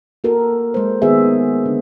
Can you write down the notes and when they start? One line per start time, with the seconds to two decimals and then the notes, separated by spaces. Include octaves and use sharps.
0.24 A#3 F#4 A4 A#4
0.74 G#3 C5
1.02 D#3 B3 F#4 G#4 E5
1.66 D3